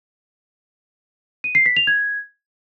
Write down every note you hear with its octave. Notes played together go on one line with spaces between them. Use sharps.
D#7
C7
B6
F7
G#6